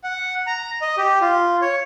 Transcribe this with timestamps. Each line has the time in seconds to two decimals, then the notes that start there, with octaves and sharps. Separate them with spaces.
0.04 F#5
0.47 A#5
0.81 D#5
0.97 G4
1.21 F4
1.62 C#5